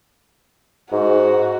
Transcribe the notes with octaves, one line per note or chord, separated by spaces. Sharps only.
G#2 F#4